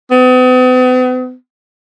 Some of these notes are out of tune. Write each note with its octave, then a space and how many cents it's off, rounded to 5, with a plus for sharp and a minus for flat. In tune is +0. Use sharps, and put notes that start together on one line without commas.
B3 +45